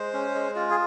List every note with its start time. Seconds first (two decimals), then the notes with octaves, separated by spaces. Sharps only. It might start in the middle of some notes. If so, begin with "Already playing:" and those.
Already playing: G#3 C5
0.13 C#4
0.35 G#3
0.55 F4
0.70 G#4